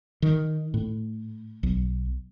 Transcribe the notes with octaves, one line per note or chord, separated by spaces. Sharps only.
D#3
A2
B1